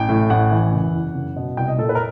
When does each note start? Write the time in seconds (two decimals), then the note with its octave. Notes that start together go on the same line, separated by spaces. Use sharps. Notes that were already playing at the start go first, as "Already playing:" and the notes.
Already playing: A1 G5
0.09 A2
0.30 A1 F#5
0.51 E3
0.72 F#1
0.93 E2
1.15 F#1
1.36 B2
1.57 C2 G5
1.68 D#5
1.78 A#2 A4
1.89 B4
1.95 A#4